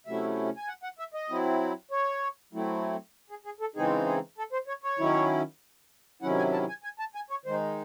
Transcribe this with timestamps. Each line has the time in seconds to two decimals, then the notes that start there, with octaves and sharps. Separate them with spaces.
0.07 C3 F#3 A3 C#4 E4 E5
0.56 G#5
0.68 F#5
0.83 F#5
0.99 E5
1.14 D#5
1.30 F#3 C4 E4
1.91 C#5
2.53 F#3 A3 C4 E4
3.30 G#4
3.45 G#4
3.60 A4
3.76 C#3 E3 G#3 C4 D#4 G#4
4.07 G#4
4.38 A4
4.53 C5
4.68 C#5
4.84 C#5
4.99 D#3 F#3 C#4 E4
6.22 C3 D#3 F#3 C#4 E4 F#5
6.38 G#5
6.53 A5
6.69 G#5
6.84 G#5
6.99 A5
7.15 G#5
7.30 C#5
7.45 D#3 G#3 D#4 C5